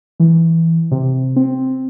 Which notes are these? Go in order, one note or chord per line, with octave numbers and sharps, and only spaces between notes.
E3
C3
C4